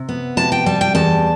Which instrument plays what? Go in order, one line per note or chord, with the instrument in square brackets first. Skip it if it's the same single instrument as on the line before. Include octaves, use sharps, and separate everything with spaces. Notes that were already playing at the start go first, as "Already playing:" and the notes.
Already playing: [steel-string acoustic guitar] C3
B3
C3 A5
G5
G3 A5
G5
E2 A5